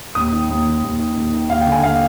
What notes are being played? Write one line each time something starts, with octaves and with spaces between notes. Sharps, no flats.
D#2 D#6
D#3
D#2
D#3
D#2
D#3
D#2
D#3
D#2 F5
G5
D3
G#5
D#2 F5